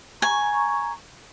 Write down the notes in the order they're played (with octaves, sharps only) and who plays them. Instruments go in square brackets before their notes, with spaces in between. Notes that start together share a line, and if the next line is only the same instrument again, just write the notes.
[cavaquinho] G#5 [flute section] A#5 C#6